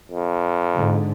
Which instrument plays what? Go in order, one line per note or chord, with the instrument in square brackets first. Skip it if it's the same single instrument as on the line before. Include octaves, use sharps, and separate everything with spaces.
[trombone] F2
[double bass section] G#2 D3